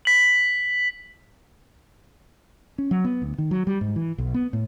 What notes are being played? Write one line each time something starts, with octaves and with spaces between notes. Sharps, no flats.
B6 F#7
C#4
F#3
B3
D2
D#3
F#3
G3
G#2
E3
B1
B3
A2